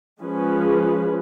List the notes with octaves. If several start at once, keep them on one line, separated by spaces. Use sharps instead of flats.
F3 G#3 C#4 G#4 B4